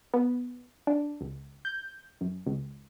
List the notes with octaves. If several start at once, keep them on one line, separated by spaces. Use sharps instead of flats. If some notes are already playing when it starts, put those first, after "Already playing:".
B3
D4
C#2
G6
F#2
C#2